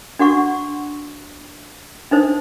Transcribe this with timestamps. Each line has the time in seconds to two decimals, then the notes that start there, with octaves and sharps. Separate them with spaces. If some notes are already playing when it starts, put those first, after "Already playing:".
0.19 D4 F#4 F#5 C#6
2.11 D4 D#4 C5